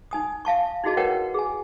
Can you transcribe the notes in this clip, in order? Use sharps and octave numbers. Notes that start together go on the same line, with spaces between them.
D#4 G#5 D#6
E5 F5 A5 C#6
D#4 E4 F#4 G#4 D#5 A5
A#4 B4 C#5 F#5 G5
G#4 G#5